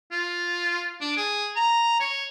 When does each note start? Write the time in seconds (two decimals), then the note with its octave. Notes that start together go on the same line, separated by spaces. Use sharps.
0.12 F4
1.01 D4
1.17 G#4
1.56 A#5
2.00 C#5